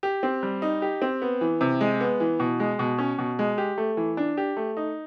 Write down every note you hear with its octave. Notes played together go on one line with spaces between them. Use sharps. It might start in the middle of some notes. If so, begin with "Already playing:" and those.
G4
C4
G3
D#4
G4
C4
B3
E3
C3
G#3
B3
E3
B2
G#3
B2
C#4
B2
G#3
G4
A3
E3
D4
G4
A3
D#4